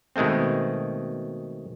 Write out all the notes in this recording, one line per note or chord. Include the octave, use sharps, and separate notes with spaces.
B2 D#3 G#3 A3 C4